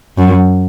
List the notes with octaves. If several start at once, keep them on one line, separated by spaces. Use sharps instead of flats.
F#2